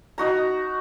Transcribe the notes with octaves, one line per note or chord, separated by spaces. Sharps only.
D#4 F#4 A#5